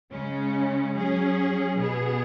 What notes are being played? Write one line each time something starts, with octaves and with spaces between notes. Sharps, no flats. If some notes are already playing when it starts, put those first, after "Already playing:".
C#3 G#3 C#4
F#3 C#4 G#4
B2 B3 G#4